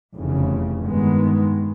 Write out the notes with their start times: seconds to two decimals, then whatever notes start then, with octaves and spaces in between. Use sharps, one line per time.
0.14 F1 E2 C#3
0.83 G2 D#3 G#3 B3